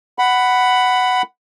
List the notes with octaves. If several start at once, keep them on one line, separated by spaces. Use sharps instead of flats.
F#5 B5